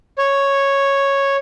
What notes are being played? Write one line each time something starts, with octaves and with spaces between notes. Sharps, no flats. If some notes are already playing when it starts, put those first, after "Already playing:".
C#5